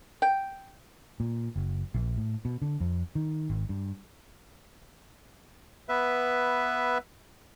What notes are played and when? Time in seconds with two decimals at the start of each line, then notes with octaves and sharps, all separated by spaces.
0.22 G5
1.20 A#2
1.56 F#1
1.94 A#1
2.17 A2
2.45 B2
2.62 D3
2.80 F2
3.15 D#3
3.50 G#1
3.69 G2
5.89 B3 B4 E5